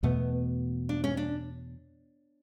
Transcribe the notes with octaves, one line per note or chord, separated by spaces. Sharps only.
E2 B2 A3 B3
D4
C#4
D4